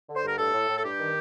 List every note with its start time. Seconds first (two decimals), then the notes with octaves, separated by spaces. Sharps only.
0.09 D3
0.16 C5
0.24 G2 A#4
0.38 A2 A4
0.54 A2
0.69 A2
0.78 A4
0.84 G2 G4
0.99 D#3